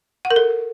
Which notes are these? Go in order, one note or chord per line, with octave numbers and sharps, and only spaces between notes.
F#5
A#4
A4